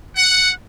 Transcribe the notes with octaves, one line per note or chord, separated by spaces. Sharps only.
F#5